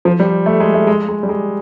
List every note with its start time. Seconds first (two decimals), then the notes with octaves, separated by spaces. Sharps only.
0.05 F3
0.20 G3
0.46 A3
0.60 G#3
0.74 A3
0.87 G#3
1.08 G#3
1.23 G3
1.29 G#3